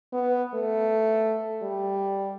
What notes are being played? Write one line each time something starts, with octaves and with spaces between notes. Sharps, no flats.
B3
A3
G3